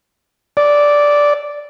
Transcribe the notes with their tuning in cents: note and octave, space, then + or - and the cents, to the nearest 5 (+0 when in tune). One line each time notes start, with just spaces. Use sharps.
D5 -5